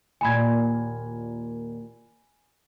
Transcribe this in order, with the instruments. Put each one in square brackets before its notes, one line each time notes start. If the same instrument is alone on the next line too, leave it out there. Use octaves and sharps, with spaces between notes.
[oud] D#2 A#2 [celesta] G#5 B5 G#6